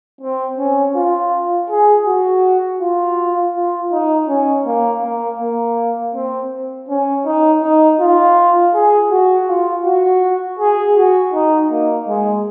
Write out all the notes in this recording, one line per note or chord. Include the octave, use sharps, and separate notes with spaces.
C4
C#4
F4
G#4
F#4
F4
F4
D#4
C#4
A#3
A#3
A#3
C4
C#4
D#4
D#4
F4
G#4
F#4
F4
F#4
G#4
F#4
D#4
A#3
G#3